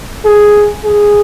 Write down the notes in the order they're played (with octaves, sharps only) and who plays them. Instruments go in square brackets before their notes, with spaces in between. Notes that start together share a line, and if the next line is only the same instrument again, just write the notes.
[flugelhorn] G#4
G#4